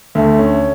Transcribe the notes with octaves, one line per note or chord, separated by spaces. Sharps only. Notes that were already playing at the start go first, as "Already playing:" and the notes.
D2 A3
C#4